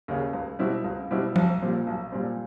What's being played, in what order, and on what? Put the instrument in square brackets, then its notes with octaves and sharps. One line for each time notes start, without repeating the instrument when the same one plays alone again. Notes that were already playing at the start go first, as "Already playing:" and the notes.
[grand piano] D#2 C#3
C#2
B2 G3 C4 E4
C#2
B2 G3 C4 E4
[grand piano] B1 [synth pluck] F3
[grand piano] A#2 G3 C4
B1
A#2 G3 C4